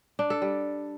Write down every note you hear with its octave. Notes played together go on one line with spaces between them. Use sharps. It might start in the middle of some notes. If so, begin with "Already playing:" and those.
D4
A4
G3